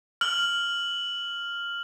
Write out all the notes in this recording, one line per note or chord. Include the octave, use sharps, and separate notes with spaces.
F6 F#7